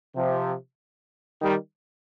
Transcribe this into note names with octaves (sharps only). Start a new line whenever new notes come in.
C3 F3
D#3 G3